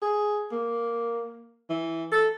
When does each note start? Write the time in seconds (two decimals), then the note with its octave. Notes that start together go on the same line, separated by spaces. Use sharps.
0.02 G#4
0.52 A#3
1.70 E3
2.12 A4